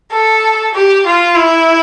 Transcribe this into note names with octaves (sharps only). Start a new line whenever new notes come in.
A4
G4
F4
E4